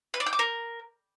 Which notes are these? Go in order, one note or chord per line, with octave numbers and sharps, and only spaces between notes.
B4
D5
G5
D6
A#4